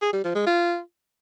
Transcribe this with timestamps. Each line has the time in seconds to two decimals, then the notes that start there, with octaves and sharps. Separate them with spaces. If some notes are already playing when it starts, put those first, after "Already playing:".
0.02 G#4
0.13 G3
0.24 F3
0.35 G#3
0.47 F4